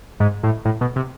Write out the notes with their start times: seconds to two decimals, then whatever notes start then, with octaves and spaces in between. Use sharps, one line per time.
0.20 G#2
0.43 A2
0.65 A2
0.81 B2
0.96 C3